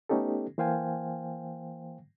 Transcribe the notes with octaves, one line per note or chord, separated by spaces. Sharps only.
A3 B3 C#4 D#4 G4 A4
E3 A#3 C5 F5 G5 G#5